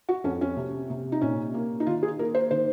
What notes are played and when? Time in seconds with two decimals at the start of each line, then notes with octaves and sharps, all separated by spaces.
0.09 F#4
0.24 F2 C#4
0.41 C#4
0.57 C3
0.90 C3
1.12 D#4
1.21 A#2 C#4
1.54 A#3
1.80 D#4
1.87 D#3 F4
2.03 G#4
2.19 A#3 A#4
2.35 C5
2.51 D#3 C5